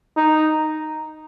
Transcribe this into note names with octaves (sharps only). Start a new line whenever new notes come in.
D#4